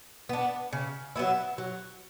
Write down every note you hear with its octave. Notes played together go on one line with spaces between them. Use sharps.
B3 D4
C#3
F#3 B3 E4
F#3